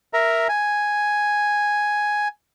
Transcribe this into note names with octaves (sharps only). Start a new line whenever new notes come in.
A#4 E5 A#5
G#5